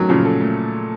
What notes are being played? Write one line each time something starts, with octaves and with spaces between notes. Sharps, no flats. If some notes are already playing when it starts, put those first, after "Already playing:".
Already playing: D#3 F#3 A3 C#4
A#2 C#3 F3
A4
A3